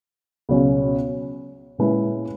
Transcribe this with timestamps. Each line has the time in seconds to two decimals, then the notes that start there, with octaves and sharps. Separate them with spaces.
0.49 C#2 B2 F#3 C#4 G#4
1.78 A#2 G#3 C#4 E4 B4